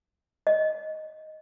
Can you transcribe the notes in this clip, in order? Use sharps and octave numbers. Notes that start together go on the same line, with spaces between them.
D#5